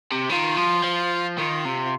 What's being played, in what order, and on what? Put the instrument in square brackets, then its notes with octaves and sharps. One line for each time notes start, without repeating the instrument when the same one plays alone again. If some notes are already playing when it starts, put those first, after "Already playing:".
[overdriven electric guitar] C3
[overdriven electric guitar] D#3 [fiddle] F4
[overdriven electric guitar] F3
F3
[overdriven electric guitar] D#3 [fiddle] F4
[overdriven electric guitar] C3